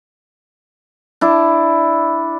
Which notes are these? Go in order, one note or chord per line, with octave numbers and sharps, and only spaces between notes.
D4 E4